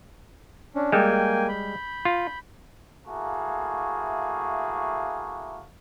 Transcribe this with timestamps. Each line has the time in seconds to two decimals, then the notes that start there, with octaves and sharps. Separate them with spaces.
0.75 C#4 D4
0.92 G3 G#3 A#3 G5 G#5
1.49 B5 G6
2.05 F4
3.06 A3 A#3 E4 F#4 G#4 F5